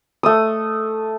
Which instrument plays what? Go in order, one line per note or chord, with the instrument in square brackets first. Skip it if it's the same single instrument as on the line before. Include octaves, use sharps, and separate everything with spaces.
[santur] A3 D#6